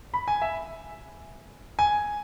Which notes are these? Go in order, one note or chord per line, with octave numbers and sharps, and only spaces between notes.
B5
G#5
E5
G#5